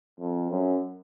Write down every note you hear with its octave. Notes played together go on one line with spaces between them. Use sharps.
F2
F#2